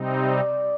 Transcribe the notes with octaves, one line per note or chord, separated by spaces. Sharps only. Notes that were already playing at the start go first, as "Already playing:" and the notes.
Already playing: C3 G3 C4 D#4
D5